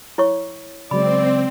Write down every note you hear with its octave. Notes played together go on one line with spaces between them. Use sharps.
E4 C#5 C#6
C#3 F#3 G#3 C4 D5 B5